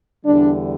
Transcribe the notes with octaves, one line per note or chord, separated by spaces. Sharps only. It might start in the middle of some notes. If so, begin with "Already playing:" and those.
E2 D3 G3 D4